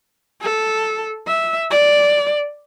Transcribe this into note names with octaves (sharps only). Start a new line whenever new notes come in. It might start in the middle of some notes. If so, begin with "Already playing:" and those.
A4
E5
D5